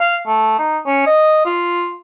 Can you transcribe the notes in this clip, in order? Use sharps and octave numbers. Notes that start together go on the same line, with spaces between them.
F5
A3
D#4
C#4
D#5
F4